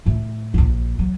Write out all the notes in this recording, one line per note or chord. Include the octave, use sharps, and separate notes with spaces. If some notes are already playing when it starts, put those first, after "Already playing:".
A2 A3
D#1 A#1
F#3